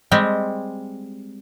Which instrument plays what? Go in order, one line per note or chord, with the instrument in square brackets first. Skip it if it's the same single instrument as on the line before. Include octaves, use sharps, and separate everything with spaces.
[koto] G3 G#3 C4